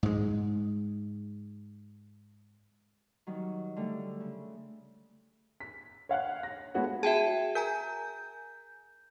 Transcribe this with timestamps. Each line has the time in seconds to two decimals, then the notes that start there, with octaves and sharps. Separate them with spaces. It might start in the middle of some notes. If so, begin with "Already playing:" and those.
0.03 G#2 G#3
3.27 D#3 F#3 G3 D#4
3.76 D3 G3 A3
4.20 C#3
5.60 B6
6.09 C#5 F5 F#5 F#6
6.43 A#6
6.74 G#3 A3 B3 F#4 C#5 F#5
7.03 F#4 G#4 E5 G5 A5
7.55 A#4 G#5 A#5 G6